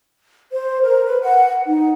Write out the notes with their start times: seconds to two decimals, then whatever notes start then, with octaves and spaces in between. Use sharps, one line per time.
0.52 C5
0.83 A#4
1.06 B4
1.22 F#5
1.67 D#4